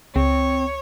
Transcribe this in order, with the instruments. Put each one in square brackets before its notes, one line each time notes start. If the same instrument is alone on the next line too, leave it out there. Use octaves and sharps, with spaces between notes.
[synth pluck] C#2 [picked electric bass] C4 [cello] C#5